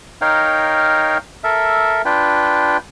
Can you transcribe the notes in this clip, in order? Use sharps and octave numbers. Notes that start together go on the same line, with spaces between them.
D#4 A#4 C#5 F5 G5
A4 A#4 E5
D4 F4 B4 G5